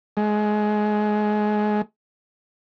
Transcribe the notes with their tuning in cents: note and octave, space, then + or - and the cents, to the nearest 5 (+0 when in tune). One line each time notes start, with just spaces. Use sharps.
G#3 +20